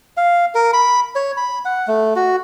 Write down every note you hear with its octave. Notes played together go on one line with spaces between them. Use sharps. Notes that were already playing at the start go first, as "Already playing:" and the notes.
F5
A#4
B5
C#5
B5
F#5
A3
F#4